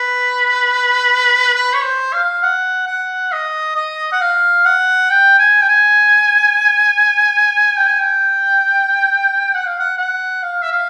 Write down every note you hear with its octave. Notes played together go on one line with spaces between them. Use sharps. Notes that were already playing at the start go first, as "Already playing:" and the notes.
Already playing: B4
B4
C#5
C5
F5
F#5
F#5
D#5
D#5
F#5
F5
F#5
G5
G#5
G5
G#5
G5
G#5
G5
F#5
F5
F#5
F#5
F5
E5
F5